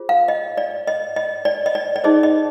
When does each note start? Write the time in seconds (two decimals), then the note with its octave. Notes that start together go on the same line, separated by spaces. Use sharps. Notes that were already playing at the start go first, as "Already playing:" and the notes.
Already playing: F4 G#4 C5
0.09 F5
0.28 D#5
0.57 D5
0.87 D#5
1.16 D#5
1.45 D5
1.66 D#5
1.75 D5
1.96 D5
2.04 D#4 G#4 C5 D#5
2.23 D#5